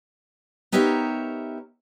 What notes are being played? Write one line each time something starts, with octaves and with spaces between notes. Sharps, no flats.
B3 D#4 G4 A#4 C#5 E5